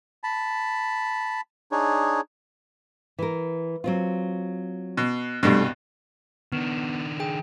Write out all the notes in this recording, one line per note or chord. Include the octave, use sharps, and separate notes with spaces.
A5 B5
D4 D#4 G#4 C#5
E3 A#4
F#3 C4 F4
B2
C2 G2 B2 G3 A3 D4
D#3 B3 D4
G#4 G5